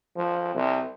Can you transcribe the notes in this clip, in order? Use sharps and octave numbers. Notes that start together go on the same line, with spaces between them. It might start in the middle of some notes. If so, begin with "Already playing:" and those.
F3
C2